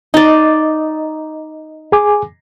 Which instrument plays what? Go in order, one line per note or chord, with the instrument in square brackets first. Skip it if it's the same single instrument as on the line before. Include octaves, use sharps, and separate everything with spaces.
[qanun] D#4 D5 [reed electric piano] D#5
[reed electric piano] G#4 G#5 D6